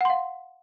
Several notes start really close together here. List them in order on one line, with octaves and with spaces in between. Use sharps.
F#5 C6 F5